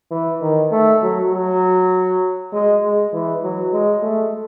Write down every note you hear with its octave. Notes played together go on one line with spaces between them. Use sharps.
E3
D#3
A3
F#3
F#3
G#3
G#3
E3
F#3
G#3
A3